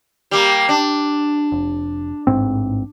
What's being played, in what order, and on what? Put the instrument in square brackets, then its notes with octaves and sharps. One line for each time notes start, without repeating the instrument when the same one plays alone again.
[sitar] G3 A#3
D4
[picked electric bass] F1
A1 G#2 C4